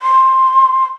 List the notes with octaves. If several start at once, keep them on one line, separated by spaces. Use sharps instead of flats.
C6